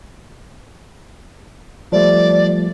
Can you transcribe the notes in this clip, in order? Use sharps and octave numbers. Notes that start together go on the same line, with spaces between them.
F3 G3 A3 D5